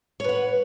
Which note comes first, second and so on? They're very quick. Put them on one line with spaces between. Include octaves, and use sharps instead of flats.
C#5 B4 F#5